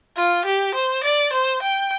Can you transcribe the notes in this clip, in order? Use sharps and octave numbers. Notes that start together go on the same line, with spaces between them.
F4
G4
C5
D5
C5
G5